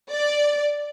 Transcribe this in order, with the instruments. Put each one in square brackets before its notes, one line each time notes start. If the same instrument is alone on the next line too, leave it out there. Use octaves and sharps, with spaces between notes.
[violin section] D5